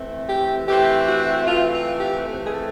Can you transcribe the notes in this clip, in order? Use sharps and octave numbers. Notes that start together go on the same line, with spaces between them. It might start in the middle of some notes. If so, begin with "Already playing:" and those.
Already playing: E3 A3 C4
G4
E3 A3 C4 G4
F#4
E3 A3 C4 F4
F4
G4
E3 A3 C4
G#4
A4